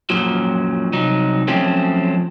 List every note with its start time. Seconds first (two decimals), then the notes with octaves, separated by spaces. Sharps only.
0.10 F#2 A#2 F3 F#3
0.93 C2 F#3 D#4
1.48 F3 F#3 A3 C4 C#4